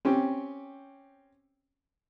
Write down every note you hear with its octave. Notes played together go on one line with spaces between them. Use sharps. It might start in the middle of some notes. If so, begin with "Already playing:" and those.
C4 C#4 G4